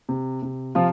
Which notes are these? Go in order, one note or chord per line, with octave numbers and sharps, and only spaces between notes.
C3
C3
C3 F3 F4